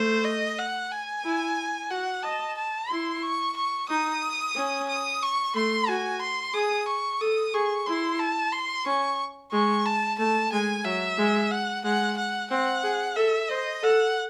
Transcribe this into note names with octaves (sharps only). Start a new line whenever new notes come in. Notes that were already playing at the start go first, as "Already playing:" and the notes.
Already playing: A3 C5
D#5
F#5
G#5
E4
F#4 F#5
D#5 A5
A5
E4 C6
C#6
C#6
D#4 D#6
C#4
D#6
C#6
A3 C6
F#4 G#5
C6
G#4 D#6
C#6
A4 D#6
G#4 C#6
E4 C6
A5
C6
C#4 C#6
G#3 C#6
A5
A3 A5
G#3 G#5
F#3 E5
G#3
F#5
G#3 F#5
F#5
C4 F#5
G#4
A4 E5
C5 D#5
A4 F#5